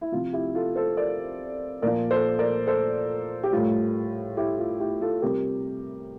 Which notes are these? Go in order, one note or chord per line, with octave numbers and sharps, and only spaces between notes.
E4
C3 F3 F4
E4 G4
F4 A4
A4 C5
A#4 D5
A#2 F3 A#4 D5
A4 C5
A#4 D5
A4 C5
G4
A2 G3 F4
E4 G4
F4
E4 G4
F4 A4
C3 G3 G4 A#4